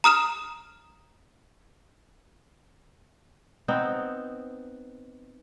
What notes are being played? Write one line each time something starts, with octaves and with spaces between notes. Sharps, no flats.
A#5 D#6 F6 E7
B3 C4 D#4